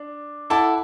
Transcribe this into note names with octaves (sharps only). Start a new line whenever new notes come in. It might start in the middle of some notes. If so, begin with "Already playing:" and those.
Already playing: D4
E4 A4 F#5 D6